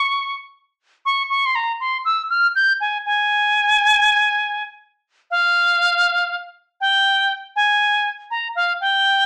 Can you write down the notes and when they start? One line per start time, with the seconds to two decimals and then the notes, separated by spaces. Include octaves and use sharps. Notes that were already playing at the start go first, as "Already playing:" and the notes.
Already playing: C#6
1.06 C#6
1.30 C#6
1.46 C6
1.55 A#5
1.80 C6
2.05 E6
2.30 F6
2.56 G6
2.81 G#5
3.06 G#5
5.31 F5
6.81 G5
7.56 G#5
8.31 A#5
8.55 F5
8.81 G5